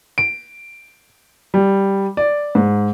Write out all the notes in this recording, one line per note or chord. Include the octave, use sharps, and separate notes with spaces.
D7
G3
D5
G#2